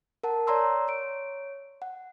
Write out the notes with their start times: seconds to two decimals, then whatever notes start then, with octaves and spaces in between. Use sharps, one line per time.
0.23 A#4 F#5 A5
0.47 C#5 D5 A#5 C6 E6
0.88 C#5 D7
1.82 F#5